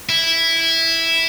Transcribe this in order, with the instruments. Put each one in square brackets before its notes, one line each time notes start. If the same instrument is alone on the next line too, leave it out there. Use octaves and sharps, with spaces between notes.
[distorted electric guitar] E4